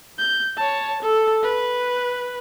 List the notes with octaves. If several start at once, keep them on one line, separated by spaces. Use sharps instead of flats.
G6
C#5 A5
A4
B4